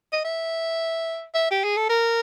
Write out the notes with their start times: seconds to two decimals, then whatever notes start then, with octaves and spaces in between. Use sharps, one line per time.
0.13 D#5
0.25 E5
1.35 E5
1.51 G4
1.64 G#4
1.77 A4
1.90 A#4